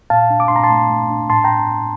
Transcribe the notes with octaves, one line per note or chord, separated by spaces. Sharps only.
A#2 F5 A5
D4
D6
D4 C6
A#5
A5 C6
A3
A3
D4
A2 A5 C6
G5 A#5